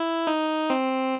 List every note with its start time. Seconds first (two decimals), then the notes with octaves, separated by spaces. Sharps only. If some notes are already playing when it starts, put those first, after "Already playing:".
Already playing: E4
0.27 D#4
0.70 C4